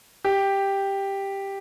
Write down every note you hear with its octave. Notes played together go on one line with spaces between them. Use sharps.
G4